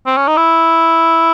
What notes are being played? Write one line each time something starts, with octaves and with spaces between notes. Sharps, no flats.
C4
C#4
D#4
E4